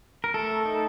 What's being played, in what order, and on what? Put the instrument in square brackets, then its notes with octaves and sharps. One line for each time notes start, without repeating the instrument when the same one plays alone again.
[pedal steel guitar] A#4
A3 A4
D#4